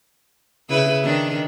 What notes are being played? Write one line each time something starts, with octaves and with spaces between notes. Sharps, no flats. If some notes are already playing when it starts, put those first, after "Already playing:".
C#3 E4 B4
D#3 D4